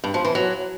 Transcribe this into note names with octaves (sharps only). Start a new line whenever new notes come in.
G2
F3
E3
F#3